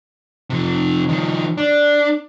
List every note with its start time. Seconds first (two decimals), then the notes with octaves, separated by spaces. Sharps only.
0.50 C3 F3
1.09 D#3 F3
1.58 D4